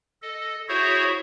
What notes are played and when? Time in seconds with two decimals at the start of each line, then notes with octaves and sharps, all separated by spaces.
0.22 A4 D#5
0.69 E4 F#4 G#4 C5 C#5 E5